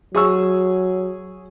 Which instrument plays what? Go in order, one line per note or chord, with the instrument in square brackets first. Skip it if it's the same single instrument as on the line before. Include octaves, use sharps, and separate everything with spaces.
[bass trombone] F#3 [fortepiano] G#4 C#6 E6